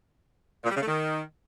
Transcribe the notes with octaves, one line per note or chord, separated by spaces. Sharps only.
A#2
G3
C#3
A3
D#3